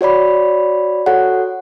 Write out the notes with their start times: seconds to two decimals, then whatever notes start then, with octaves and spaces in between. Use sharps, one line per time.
0.01 F#4 C#5 D5 B5
1.06 F#4 A4 C#5 F#5